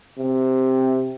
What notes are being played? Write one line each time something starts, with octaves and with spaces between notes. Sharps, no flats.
C3